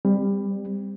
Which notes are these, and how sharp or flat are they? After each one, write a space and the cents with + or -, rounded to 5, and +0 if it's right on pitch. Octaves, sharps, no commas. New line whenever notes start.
G3 +20 C4 -15